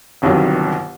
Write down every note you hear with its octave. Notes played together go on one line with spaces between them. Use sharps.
G1 C2 G2 D#3 F#3